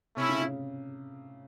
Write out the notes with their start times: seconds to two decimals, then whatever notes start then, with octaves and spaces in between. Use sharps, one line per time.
0.16 C3 A3 C#4 E4
0.29 C#3
0.42 C#3